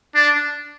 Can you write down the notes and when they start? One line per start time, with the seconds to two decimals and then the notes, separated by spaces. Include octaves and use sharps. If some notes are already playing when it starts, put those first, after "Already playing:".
0.15 D4